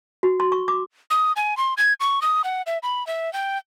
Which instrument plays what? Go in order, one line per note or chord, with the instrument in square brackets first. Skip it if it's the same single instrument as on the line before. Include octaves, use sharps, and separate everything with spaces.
[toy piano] F#4
C6
C#6
D6
[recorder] D#6
G#5
C6
G#6
C#6
D#6
F#5
E5
B5
E5
G5